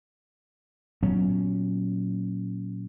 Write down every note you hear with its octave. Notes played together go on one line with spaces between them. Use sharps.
A#2 F#3 B3 C#4